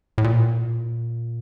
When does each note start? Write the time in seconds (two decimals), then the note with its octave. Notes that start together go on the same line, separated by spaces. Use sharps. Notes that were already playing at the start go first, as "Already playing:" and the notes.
0.18 A2
0.24 A#2